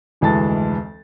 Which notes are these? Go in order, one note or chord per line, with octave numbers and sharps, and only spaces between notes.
F1 D2 E3 G#3 A5 A6